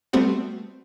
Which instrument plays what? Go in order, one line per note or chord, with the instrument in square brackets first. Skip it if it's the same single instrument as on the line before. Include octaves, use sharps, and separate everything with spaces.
[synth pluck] G3 A3 B3 C4 F#4